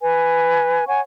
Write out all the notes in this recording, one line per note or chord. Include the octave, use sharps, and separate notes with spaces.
B4 G#5
C#5 F#5 G#5 C#6